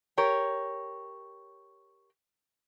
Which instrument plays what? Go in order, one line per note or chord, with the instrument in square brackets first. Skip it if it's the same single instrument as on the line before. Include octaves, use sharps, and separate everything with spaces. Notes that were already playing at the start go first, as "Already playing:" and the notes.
[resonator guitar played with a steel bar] G4 A#4 C#5